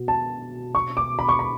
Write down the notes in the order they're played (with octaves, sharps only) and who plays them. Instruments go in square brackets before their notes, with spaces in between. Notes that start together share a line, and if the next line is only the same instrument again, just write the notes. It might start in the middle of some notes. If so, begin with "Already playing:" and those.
Already playing: [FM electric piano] B2 B3 F#4
[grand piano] A5
C#6
D6
B5
C#6
B5